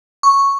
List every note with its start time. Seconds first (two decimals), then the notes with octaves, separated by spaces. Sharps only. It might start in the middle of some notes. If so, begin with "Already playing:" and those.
0.23 C#6